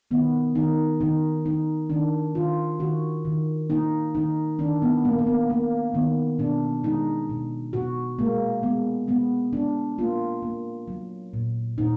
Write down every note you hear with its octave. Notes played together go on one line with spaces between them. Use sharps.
D#3 B3
D#3 D#4
D#3 D#4
D#3 D#4
D#3 D4
D#3 F4
D#3 F#4
D#3
A#3 D#4
D#3 D#4
D#3 D4
B3
A#3
A#3
B3
A#3
D#3 B3
B2 D4
G#3 D#4
B2
B2 F#4
G#3 A#3
G#3 B3
G#3 B3
G#3 D4
A#3 F4
A#3
F#3
A#2
A#2 D#4